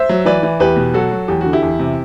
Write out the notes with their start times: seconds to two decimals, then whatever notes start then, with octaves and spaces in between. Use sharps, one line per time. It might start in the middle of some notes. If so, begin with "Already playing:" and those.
Already playing: C5 E5
0.09 F#3
0.25 E3 B4 D5
0.43 E3
0.60 E2 G4 B4
0.76 B2
0.94 F#3 F#4 A4
1.11 F#3
1.28 E2 G4
1.41 D3 F#4
1.53 E4 G4
1.62 E2
1.79 C3